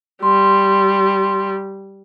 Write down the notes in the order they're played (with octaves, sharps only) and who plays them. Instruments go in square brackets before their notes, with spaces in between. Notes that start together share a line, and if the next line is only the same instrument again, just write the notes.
[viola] G3 [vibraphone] C6